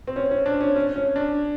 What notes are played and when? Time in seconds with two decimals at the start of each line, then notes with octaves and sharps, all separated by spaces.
0.07 C4
0.16 C#4
0.31 C#4
0.46 D4
0.60 C#4
0.76 C#4
0.96 C#4
1.16 D4